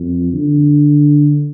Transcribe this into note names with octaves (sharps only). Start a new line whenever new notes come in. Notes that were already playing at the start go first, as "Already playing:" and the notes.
Already playing: F2
D3